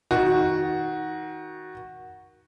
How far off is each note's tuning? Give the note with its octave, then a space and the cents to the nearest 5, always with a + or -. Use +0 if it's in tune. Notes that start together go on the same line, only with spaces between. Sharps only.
D#3 +20 F#4 +0